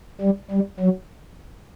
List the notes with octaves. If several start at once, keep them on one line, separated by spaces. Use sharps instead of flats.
G3
G3
F#3